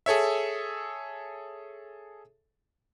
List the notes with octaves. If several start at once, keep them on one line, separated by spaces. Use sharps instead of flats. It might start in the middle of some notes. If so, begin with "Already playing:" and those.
G#4 A4 C#5 E5